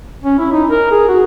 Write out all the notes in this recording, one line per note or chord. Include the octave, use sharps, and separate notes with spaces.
C#4
E4
D#4
A#4
G#4
F#4